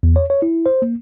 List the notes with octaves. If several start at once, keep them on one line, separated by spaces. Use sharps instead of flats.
E2
C#5
C#5
E4
C5
A#3